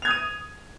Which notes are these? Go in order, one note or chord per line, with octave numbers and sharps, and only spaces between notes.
D#6 G#6 D#7 F7